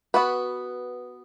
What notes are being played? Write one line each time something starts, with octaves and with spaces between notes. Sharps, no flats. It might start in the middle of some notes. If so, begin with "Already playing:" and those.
B3 F#4 B4